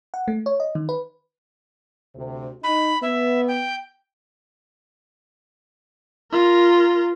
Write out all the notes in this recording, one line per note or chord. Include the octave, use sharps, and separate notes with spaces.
F#5
A3
C#5
D#5
D#3
B4
D2 C3
D#4 B5
B3 E5
G5
F4 A#4